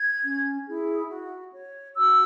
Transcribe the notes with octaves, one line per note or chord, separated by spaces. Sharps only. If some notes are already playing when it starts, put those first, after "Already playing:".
Already playing: G#6
C#4
E4 G#4
F#4
C#5
F#4 E6